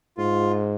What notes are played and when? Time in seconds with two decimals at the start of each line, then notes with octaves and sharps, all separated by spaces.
0.18 G#2 F4